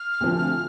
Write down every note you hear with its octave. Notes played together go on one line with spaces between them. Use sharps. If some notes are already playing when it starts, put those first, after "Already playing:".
Already playing: F6
D2 C3 F3